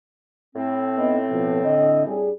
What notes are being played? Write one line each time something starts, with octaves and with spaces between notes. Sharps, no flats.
A2 C4
B3 D#4 D#5
B2 F3 B3
D3 D#5
G3 D4 G#4